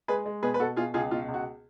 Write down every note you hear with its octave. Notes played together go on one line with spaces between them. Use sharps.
G#3 G#4 B4
G#3
B2 G#4 B4
B4
B2 F#4 A4
B2 F4 G#4
C#2 F4 G#4
B2 F4
C#2
F#4